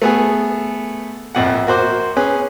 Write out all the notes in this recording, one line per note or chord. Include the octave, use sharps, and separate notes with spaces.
A3 B3 G#4
A#1 F2 F#5
A#3 F#4 C5 D6
C#4 G#4 B4